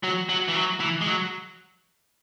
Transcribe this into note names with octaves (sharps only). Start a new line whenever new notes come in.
F#3
F#3
E3
F#3
E3
G#3
F#3